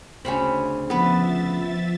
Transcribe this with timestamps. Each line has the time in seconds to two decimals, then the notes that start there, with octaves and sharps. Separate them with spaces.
0.25 D2 C#3 C4 C#4 B5
0.90 F3 B3 B4 E5 A6